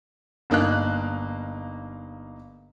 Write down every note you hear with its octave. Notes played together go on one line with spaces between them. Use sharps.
G1 A#3 D#4 F5 F#6